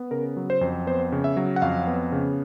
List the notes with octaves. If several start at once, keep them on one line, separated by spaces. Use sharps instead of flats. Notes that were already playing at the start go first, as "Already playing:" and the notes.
Already playing: B3
C#3 A#4
F#3
C5
F2
B3 C5
C#3
E5
F#3
F#5
F2 F5
B3
C#3